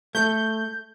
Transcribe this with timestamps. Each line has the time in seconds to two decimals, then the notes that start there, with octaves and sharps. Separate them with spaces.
0.15 A3 G6